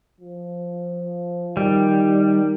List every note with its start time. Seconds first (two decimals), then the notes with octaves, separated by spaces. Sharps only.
0.20 F3
1.57 D#3 G3